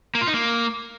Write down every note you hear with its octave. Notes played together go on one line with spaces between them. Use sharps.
A#3
F4
D#4
A#3